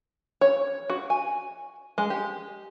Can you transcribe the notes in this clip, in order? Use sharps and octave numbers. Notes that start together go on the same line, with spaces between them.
C#5
F#4
G#5
G#3
G4